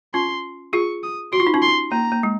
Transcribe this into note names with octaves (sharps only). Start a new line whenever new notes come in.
C#4 F4 C6
F4 G#4 C#6
D#6
F#4 C6
F4
D#4
C#4 F4
C6
A#3 A#5
A#3
G#3